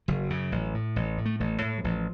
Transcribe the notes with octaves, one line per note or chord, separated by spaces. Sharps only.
F#1 F#3
F#2 C#3
A1
A2
A1
A2
A3
A1 A3
A2
F#3
A1 F3